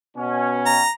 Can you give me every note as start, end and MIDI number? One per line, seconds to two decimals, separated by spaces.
0.16 0.82 47
0.16 0.82 61
0.66 0.90 82